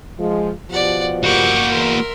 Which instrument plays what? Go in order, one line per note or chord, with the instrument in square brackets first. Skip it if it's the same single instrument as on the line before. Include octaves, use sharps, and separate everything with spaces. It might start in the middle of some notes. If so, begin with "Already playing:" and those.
[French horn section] F3 G#3
[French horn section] B2 F3 G4 [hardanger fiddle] D5 F#5
[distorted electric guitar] A#3 F#4 [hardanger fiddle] F#5 D6 [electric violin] C#6 G6
[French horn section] E2 E3 [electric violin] A#4 [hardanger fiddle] E5 C6